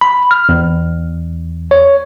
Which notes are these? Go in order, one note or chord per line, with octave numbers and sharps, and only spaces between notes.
B5
F6
E2
C#5